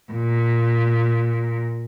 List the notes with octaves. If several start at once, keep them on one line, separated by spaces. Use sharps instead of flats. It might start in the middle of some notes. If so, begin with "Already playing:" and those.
A#2